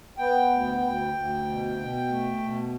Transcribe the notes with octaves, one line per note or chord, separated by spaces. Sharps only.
B3 G5
D2
D2
D2
B2
B2
A3
B2